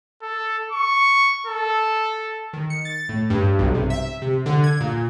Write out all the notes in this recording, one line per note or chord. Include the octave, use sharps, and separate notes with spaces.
A4
C#6
A4
D#3
C#7
A6
A2
G2
B1
C3
E5
C3
D3
G#6
A#2